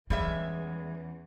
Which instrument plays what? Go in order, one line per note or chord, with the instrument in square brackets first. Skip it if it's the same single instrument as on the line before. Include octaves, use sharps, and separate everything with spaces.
[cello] E2 E3 [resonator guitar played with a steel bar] G3 G#3 E5 [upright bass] C#4